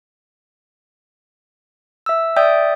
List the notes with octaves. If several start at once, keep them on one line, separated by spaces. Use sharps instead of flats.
E5 E6
D5 E5 G5 D#6 G6